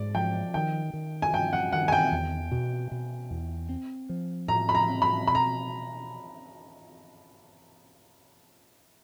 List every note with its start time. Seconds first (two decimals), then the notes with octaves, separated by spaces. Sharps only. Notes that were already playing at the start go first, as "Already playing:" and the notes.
Already playing: G#2 D5
0.15 F3 G5
0.54 D#3 G5
0.93 D#3
1.22 G#5
1.33 G2 G5
1.53 F#5
1.72 D#3 F#5
1.88 G#5
1.92 G5
2.12 E2
2.52 B2
2.92 B2
3.31 E2
3.69 C4
4.09 F3
4.48 A2 A#5
4.69 B5
4.75 A#5
4.89 C4
5.02 B5
5.27 B2 B5
5.35 A#5